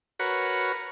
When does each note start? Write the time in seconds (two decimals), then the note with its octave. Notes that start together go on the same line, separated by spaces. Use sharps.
0.19 F#4 A#4 B4 C#5